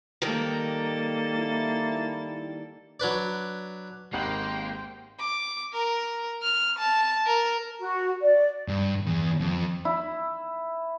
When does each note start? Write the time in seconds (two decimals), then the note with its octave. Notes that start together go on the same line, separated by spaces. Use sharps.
0.22 D#3 G3 A#3 A4 A#4 A6
1.39 E4
3.00 F#3 D4 B4 D5
4.13 G#1 A#3 G4 C5 F#5 G5 G6 F#7
5.20 D6
5.73 A#4
6.42 F6
6.79 A5
7.26 A#4
7.79 F#4
8.21 D5
8.68 G2
9.06 E2
9.40 F2
9.85 E4